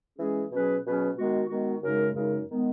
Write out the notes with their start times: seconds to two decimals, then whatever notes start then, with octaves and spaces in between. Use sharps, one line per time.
0.18 E3 G#3 C#4 G#4
0.51 B2 F#3 C#4 G#4 B4
0.84 B2 F#3 C#4 G#4 B4
1.17 D#3 G#3 B3 F#4
1.49 D#3 G#3 B3 F#4
1.82 F#2 C#3 G#3 D#4 A#4
2.14 F#2 C#3 G#3 D#4 A#4
2.48 D#3 G#3 B3